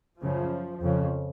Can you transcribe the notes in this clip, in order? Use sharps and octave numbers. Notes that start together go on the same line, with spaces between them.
F#2 C#3 F3
F2 C#3